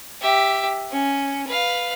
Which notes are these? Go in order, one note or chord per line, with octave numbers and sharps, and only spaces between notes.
G4 E5
C#4
B4 F5